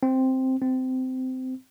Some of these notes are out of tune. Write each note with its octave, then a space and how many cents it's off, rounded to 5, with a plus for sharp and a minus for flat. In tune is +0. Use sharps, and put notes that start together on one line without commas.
C4 +0
C4 -20